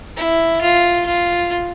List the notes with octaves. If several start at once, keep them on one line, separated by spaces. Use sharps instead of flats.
E4
F4
F4